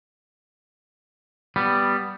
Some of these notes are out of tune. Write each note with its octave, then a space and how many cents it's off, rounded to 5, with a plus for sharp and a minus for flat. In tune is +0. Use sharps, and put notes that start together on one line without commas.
G3 +0 B3 +0